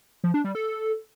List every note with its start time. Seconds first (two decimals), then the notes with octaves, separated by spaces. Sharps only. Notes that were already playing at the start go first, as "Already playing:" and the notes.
0.24 F3
0.34 D4
0.44 G3
0.55 A4